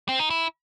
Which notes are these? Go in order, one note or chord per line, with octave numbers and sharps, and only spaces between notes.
C4
D#4
E4